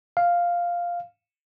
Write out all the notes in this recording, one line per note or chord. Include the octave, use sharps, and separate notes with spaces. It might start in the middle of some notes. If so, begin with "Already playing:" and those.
F5